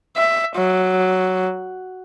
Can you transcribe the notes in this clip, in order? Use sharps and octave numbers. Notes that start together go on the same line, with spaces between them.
E5
F#3